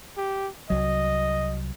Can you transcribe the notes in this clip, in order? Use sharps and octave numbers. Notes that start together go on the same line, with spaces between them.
G4
C2 F#3 D#5